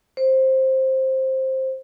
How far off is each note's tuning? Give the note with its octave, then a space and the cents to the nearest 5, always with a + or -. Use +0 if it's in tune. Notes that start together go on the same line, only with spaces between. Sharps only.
C5 +10